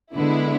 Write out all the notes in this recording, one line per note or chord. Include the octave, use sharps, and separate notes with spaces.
D3 G#3 B3 E4